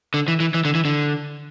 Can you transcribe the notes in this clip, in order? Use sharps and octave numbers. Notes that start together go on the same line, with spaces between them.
D3
E3
E3
E3
D3
E3
D3